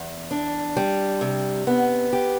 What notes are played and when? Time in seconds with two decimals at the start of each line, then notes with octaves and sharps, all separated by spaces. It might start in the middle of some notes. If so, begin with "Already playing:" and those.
Already playing: E2
0.31 D4
0.77 G3
1.21 C3
1.67 B3
2.13 G4